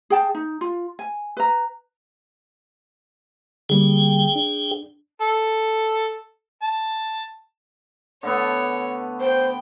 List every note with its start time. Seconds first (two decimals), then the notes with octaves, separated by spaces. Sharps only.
0.10 G#4 G5 A5
0.35 D#4
0.61 F4
0.99 G#5
1.37 B4 A#5
3.69 D3 G3 A#3 G#4 G5
4.36 D4
5.21 A4
6.63 A5
8.23 D3 A3 B3 C#5
9.20 C5 G5